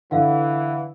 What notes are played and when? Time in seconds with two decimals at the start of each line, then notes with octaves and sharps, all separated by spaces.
0.11 D3 E3 E4 B4 F5 F#5